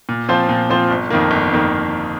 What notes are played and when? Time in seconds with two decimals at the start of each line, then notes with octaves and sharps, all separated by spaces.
0.09 A#2
0.29 F3 C4 F4 C5
0.49 A#2
0.70 F3 C4 F4 C5
0.91 G1
1.10 F2 D#3 A#3
1.31 G1
1.51 F2 D#3 A#3